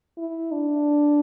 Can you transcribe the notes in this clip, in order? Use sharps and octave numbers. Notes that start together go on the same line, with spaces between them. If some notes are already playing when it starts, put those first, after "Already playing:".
E4
D4